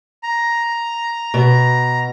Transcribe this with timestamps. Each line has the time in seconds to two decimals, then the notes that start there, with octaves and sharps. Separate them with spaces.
0.23 A#5
1.34 B2